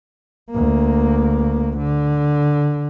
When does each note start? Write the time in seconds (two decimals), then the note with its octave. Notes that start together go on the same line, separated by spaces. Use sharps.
0.51 D2 A#3
1.78 D3